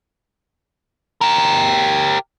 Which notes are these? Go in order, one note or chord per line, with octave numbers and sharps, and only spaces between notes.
G4 A#4